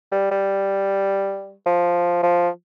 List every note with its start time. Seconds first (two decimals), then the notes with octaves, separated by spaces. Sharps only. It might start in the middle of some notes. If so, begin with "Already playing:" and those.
0.11 G3
0.31 G3
1.66 F3
2.23 F3